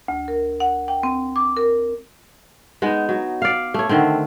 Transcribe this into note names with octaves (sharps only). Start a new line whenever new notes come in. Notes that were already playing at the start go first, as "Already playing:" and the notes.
D2
A#4
F#5
G5
C4
D6
A#4
G#3 B3 D#4
F#3
D5 F5
A3 C#5
D3 D#3 A3 C4